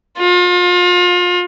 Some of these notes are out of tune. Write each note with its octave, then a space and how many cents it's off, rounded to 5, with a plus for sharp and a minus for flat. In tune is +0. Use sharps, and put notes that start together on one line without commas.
F4 +35